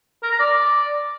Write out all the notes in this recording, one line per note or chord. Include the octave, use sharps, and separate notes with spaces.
A#4
A#5
D5